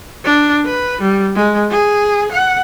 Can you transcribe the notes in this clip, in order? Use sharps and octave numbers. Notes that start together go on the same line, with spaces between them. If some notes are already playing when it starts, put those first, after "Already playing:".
D4
B4
G3
G#3
G#4
F#5